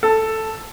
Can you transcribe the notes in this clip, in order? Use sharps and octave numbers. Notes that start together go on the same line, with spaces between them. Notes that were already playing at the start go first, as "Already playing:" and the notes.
A4